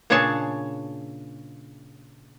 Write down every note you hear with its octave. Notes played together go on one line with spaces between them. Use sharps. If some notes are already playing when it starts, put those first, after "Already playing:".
A#2 C#3 D4 G#4 C#5 A5